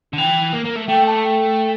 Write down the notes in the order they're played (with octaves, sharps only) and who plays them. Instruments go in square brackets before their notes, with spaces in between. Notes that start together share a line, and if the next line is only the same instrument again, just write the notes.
[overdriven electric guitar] D3
[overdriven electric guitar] E3 [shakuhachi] G5
[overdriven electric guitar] A#3
A#3
A3
[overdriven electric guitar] A3 [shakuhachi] G5
[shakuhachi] A5
G5